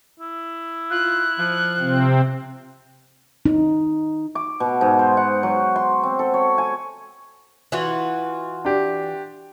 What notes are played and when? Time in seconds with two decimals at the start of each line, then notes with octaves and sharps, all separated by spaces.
0.20 E4
0.90 F4 F#6
1.38 F3
1.80 C3 C4
3.46 D#4
4.35 D6
4.60 B2
4.81 G#2
4.99 C5
5.17 F#5
5.43 F#3
5.76 C6
6.03 C4
6.19 A4
6.34 C#5
6.58 G#5
7.72 E3 F4 F#4
8.65 D4 G4